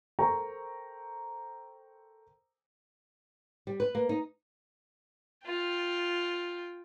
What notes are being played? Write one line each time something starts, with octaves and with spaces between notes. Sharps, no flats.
A4 A#4 C5 G5 A#5 C#6
G3
B4
A#3
D#4
F4 G5